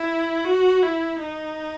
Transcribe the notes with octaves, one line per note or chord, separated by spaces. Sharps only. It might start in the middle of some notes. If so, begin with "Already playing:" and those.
Already playing: E4
F#4
E4
D#4